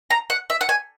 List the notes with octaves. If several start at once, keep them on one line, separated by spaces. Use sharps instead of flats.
A#5
F#5
E5
F#5
G#5